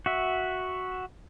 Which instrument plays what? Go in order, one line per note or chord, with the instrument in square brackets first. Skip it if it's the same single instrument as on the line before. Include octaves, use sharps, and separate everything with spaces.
[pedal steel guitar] F#4 E5